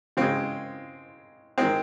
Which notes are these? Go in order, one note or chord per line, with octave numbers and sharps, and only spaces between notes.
C#3 G#3 C4
D#3 G#3 C4